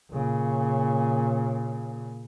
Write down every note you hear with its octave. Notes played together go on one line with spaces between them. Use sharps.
A#2 C#3